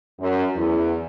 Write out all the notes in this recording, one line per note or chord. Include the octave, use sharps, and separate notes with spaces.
F#2
E2